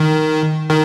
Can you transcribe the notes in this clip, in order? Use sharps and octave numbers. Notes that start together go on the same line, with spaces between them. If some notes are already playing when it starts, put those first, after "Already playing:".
Already playing: D#3
D#3